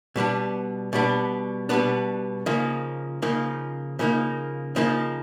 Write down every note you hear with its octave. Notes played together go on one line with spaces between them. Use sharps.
B2 G3 B3 D4
B2 G3 B3 D4
B2 G3 B3 D4
C#3 F3 A#3 D#4
C#3 F3 A#3 D#4
C#3 F3 A#3 D#4
C#3 F3 A#3 D#4